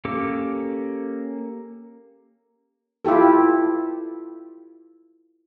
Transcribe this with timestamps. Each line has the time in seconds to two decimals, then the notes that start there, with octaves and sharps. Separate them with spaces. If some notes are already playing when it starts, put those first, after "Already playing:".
0.05 A#3 C#4 G4 A4 D6
3.05 E4 F4 G4 A4